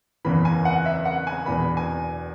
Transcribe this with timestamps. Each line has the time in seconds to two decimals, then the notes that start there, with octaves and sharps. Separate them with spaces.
0.25 F#1 E2 E3 B5
0.45 G#5
0.65 F#5
0.86 E5
1.05 F#5
1.27 G#5
1.46 E1 E2 E3 B5
1.77 G#5